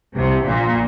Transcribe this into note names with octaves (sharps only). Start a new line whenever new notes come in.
C2 C3
A#1 A#2